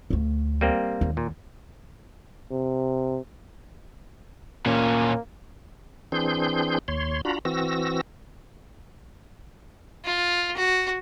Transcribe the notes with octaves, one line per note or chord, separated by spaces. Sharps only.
D2 A3
G3 A#3 C4
D#2
A#2
C3
A#2 A#3 C#4
E3 C4 D4 G#4 C6 G6
D#2 C#5 C6
D4 F4 F#4 A#5 B5
E3 C4 F#4 E6 A#6
F4
F#4